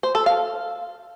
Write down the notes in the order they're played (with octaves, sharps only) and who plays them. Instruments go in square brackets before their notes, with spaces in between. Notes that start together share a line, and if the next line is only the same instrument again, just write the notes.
[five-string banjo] C5
A4
F5